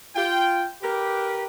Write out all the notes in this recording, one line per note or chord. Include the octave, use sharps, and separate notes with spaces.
F4 G5
G4 A#4 B4